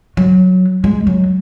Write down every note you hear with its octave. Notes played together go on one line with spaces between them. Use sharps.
F#3
G#3
F#3